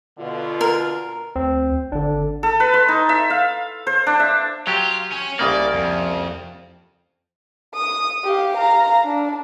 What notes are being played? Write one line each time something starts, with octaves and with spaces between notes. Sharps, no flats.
B2 D3 F4
A#4
D2 C4
G#1 D3 D4
A4
B4
C6
D#4
E5
F5
C5
D4
E5
F#3 F4 G4
C#4
C2 C#3 A#3 D5
F2
D#6
G4 F5
F5 A#5
D4